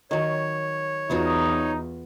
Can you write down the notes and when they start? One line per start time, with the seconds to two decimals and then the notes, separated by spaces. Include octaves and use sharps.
0.11 D#3 F#3 C#5
1.10 E2 B3 D#4 F4 F#4